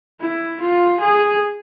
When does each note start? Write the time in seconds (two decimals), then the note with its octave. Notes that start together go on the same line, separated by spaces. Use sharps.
0.20 E4
0.61 F4
1.00 G#4